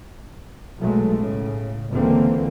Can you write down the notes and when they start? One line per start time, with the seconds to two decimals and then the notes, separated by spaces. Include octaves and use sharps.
0.79 B1 A#2 F#3 G#3 A3
1.14 A2 C#3
1.92 C#2 D3 E3 A#3 C4